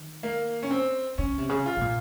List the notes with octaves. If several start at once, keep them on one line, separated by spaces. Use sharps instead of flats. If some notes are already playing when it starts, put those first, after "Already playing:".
Already playing: D#3
A#3
C#4
C4
C#3 C#4
C3
C#3
F4
C3
A#2